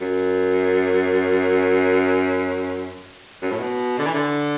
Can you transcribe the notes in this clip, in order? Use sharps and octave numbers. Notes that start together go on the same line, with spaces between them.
F#2
F#2
A2
B2
D3
E3
D3